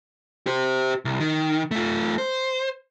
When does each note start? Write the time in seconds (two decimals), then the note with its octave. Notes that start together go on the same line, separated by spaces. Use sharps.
0.47 G4 C5
1.05 C2
1.20 D#3
1.71 A3 F4
2.18 C5